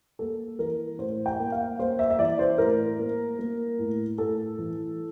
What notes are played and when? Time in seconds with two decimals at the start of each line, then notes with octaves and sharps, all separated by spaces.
0.19 A#3 A4
0.59 E3 A#4
0.99 A2 C5
1.26 G5
1.39 A#3
1.52 F5
1.79 A#3 C5
1.99 E5
2.10 E5
2.19 E3 D5
2.39 C5
2.58 A2 A#4
2.99 A#3
3.39 A#3
3.79 A2
4.18 A2 A4
4.59 E3